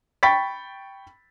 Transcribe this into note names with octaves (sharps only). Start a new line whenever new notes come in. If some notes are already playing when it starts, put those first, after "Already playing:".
G5 B5 C#6 A6 B6